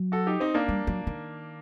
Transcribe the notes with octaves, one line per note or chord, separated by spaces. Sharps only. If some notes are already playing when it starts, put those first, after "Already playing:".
Already playing: F#3
F#4 A4
D#4 G4
C4 D#4
A#3 D4
G3
F#3
D#3